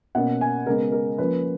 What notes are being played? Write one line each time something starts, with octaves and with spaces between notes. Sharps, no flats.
B2 A#3 C#4 F#5
G#5
C#3 G#3 B3 A#4
A#4
F3 A#3 C#4 B4